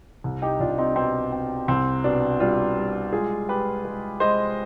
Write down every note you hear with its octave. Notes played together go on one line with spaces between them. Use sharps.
C2
D#4 G4
C2 D4 F4
C4 D#4
B2 C4 D#4
C4
C2 C4
B2 D4
G3 D4 F4
G3
G#3 F4 G#4
G#3 G4 B4
G#3
G#3 C5 D#5